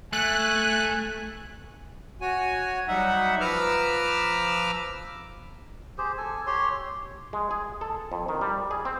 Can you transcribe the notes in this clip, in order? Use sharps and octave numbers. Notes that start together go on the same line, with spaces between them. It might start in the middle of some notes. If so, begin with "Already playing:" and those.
A3 G#5 F#6
F#4 C#5 G#5
F#3 G3 D#4 E5 F#5
F3 B4 A#5 D6 E6 F6
G4 G#4 C5
A4 G#5
G4 C#5 C6
G#3
G#4
A4
F2
D#3
G3
G#4
C4